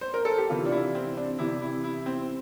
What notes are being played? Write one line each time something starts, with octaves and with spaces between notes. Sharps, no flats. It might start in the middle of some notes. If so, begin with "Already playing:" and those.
C5
A#4
A4
G4
C3 E3 F4
D4
E4
C4
D4
C3 E3 E4
E4
E4
C4